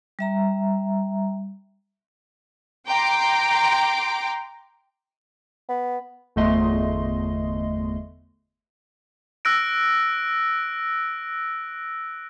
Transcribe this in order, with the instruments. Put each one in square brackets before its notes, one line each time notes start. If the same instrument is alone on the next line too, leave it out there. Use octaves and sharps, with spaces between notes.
[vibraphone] G3 E5 A#5
[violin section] G5 A#5 C6 D6
[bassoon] B3
[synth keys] G1 E2 A3 D#5 C6
[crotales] E6 F#6 A#6 D7